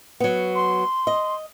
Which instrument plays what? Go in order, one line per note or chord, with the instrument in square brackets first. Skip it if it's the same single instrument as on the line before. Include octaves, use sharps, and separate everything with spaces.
[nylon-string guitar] F#3 B3
[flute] C6
[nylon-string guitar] D#5